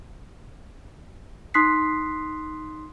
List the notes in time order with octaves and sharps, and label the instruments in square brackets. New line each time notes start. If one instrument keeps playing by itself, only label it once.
[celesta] D#4 C6 D#6 F#6 B6 C7